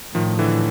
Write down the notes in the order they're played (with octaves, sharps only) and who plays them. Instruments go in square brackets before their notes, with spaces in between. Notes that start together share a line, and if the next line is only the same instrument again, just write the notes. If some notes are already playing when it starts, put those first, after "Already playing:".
[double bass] A2 [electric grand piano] D#3 F3
[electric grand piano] D3 E3